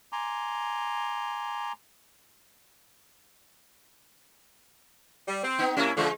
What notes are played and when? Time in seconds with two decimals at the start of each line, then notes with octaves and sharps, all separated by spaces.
0.12 G#5 A#5 C6 D6
5.28 G3
5.44 C4
5.59 B3 D#4
5.77 C3 A#3 C#4 E4
5.97 D3 F3 G#3